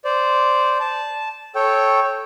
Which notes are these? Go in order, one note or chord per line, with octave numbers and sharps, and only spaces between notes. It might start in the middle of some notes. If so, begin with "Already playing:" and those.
C5 D5
A5
A4 C#5 G5